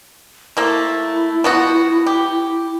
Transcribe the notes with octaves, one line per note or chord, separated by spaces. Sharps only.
A3 A#3 E4 C5
F3 B3 F#4
G4